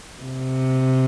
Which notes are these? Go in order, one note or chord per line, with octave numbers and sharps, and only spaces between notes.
C3